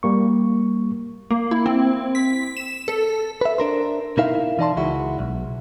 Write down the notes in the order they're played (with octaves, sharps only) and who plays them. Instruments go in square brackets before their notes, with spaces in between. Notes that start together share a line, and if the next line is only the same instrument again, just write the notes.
[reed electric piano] G3 A#3 C#6
[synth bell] A#3
E4
C4
B6
E7
A4
[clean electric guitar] B4 E5
D4 A#4 C5
B2 D#4 E4 A#4 E5 F5
E3 D#4 D5 A5 C6
C#2 G#3 E4 F#4
B1